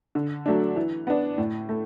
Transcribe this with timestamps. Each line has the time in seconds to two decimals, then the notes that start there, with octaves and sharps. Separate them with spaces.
0.15 D3
0.46 F#3 A3 D4
0.76 E3
1.07 B3 D4
1.38 A2
1.69 A3